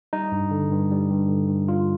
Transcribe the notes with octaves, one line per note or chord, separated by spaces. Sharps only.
G3 D#4
G2
D3
G2
G3
G2
D3
G2
G3 F4